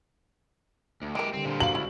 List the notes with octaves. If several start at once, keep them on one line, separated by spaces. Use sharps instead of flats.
D2
E3 G#3 G4 A#4
D3 G3 C4
A#2 D3 C5
F#4 F5 A#5 F#7
C#2 E4